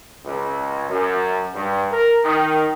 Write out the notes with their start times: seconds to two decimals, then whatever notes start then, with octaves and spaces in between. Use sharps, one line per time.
0.24 C#2
0.88 F#2
1.54 G2
1.90 A#4
2.24 D#3